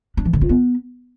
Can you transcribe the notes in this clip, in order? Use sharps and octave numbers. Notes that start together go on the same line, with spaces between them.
D4
E3
D3
F4
B3